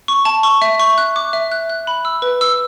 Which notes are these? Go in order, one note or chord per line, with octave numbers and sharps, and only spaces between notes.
C#6
A5
C#6
E5
C#6
F#6
D6
E5
F#6
F#6
B5
E6
B4
E6